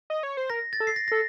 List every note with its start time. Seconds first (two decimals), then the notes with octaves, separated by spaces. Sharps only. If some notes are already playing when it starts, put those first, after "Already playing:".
0.10 D#5
0.23 C#5
0.37 C5
0.50 A#4 A#6
0.73 A6
0.80 A4
0.87 C7
0.96 A#6
1.08 A4 A#6